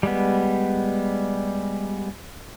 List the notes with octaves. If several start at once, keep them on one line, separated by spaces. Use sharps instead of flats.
G3 G#3 B3